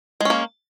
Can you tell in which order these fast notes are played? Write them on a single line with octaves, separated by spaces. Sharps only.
G#3 C#4 A#3